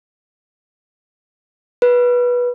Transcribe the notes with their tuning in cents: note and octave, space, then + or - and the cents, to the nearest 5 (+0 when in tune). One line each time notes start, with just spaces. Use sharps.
B4 -15